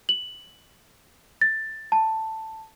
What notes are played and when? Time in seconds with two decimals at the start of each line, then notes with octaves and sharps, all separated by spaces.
0.09 F#7
1.41 A6
1.92 A5